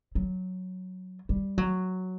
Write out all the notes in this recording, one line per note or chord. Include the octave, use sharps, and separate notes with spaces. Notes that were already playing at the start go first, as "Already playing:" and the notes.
F#3
G3
F#3